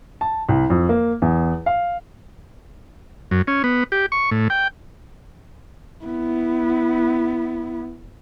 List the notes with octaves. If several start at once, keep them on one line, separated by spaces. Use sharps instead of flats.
A5
C2
F2
A#3
E2
F5
F#2
C#4
B3
G4
C#6
A2
G5
B3 E4